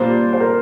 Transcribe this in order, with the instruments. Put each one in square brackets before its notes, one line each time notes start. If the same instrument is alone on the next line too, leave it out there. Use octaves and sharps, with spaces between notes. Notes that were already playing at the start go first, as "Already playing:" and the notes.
Already playing: [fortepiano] A#2 G3 A#3 D4 [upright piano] C5
[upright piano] C5
A#4